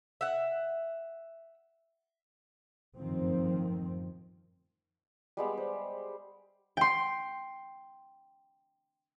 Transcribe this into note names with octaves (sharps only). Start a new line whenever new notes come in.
E5 F#5
G1 F#2 A2 D#3 F3 C4
G3 G#3 B3
C5
G5 C6